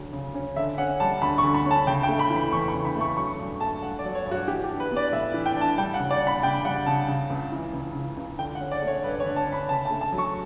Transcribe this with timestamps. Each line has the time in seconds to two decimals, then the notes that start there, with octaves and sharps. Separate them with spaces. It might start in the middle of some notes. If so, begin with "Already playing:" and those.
Already playing: D2 C#3 F#3
0.13 C#3
0.34 C#4
0.56 D3 E5
0.78 C#4 F#5
1.00 G3 A5
1.22 D2 B5
1.38 C#6
1.43 D3
1.54 B5
1.65 C#4
1.71 A5
1.87 C#3 G5
2.03 G5
2.09 A3
2.19 B5
2.30 E3
2.36 B5
2.52 E2 C#6
2.68 B5
2.74 C#3
2.85 B5
2.96 A3
3.01 C#6
3.17 F#3 C#6
3.39 G2
3.61 A3 A5
3.82 G2 F#5
3.99 D5
4.04 F#3
4.15 C#5
4.26 G2
4.31 F#4
4.47 E3 G4
4.64 G4
4.69 D4
4.80 B4
4.92 B3 D5
5.13 A2 E5
5.34 E3
5.46 G5
5.56 D4
5.61 A5
5.78 G3 G5
5.94 F#5
6.00 C#3
6.11 D5
6.22 D4
6.27 B5
6.43 C#3 G5
6.65 G3 F#5
6.86 C#3 A5
7.08 C#3
7.30 C#2
7.52 E3
7.73 C#2
7.95 C#3
8.17 C#2
8.39 D3 G5
8.55 F#5
8.60 C#4
8.71 D5
8.82 A3
8.88 C#5
9.04 G2 B4
9.20 C#5
9.26 D3
9.36 A5
9.47 C#4
9.52 B5
9.69 C#3 A5
9.85 A5
9.91 A3
10.01 A5
10.12 F#3
10.18 C#6